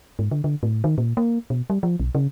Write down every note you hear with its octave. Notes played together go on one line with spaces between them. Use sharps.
G#2
D3
D3
A2
D#3
A#2
A#3
B2
G3
F3
B1
C#3